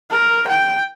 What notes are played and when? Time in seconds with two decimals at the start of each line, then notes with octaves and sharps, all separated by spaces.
0.10 A#4
0.48 G5